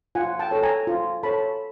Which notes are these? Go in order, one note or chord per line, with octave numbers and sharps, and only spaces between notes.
F4 F#5 G#5
G5 A5
A4 C#5
G#5 A#5
F4
A4 C#5 A5 B5